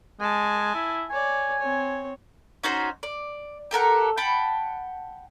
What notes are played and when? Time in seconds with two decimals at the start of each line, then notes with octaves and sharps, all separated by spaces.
0.20 G#3 G#5 A5
0.74 E4
1.10 C#5 D5 G#5
1.60 C4 C#5
2.63 C#4 D#4 F#4 C5
3.03 D5
3.71 G4 A4 A#4 F#5
4.17 F#5 G5 A5 B5